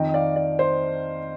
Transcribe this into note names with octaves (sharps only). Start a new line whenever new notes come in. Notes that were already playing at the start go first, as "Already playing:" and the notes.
Already playing: F2 D#3 D#5 G5
D5 F5
D5
C5